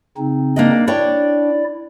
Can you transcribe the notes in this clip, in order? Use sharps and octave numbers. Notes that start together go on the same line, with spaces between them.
C#3 C4 D#4
A#3 D4 D#5
D4 E4 C#5 D5 G5